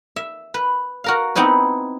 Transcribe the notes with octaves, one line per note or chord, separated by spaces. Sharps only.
E5
B4
F#4 A#4 F5
B3 C4 D#4 E4 B4